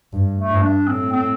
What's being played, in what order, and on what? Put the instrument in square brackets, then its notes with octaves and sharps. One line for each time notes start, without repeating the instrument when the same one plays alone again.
[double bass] G2
[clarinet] A3
[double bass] G2
[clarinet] D4
[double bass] A2 [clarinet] C4
[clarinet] C4